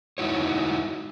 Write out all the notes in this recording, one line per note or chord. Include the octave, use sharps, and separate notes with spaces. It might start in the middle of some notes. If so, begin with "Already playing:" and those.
G#3 D#4 E4 F#4 C#5